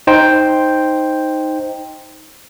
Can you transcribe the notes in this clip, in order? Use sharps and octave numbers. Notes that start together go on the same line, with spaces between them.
D#4 C5 G5